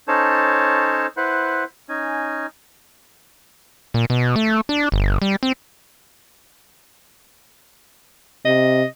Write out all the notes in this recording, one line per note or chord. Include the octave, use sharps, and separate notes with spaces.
C#4 D#4 A4 C5 C#5 A5
E4 B4 C5 F#5
C#4 D#4 G#5
A#2
B2
A3
D4
G1
G3
C4
C3 D#5